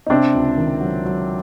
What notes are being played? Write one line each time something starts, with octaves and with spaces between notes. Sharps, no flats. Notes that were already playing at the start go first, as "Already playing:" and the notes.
D#4
C3 C4 D4
C#2
D#3
F#3
F#3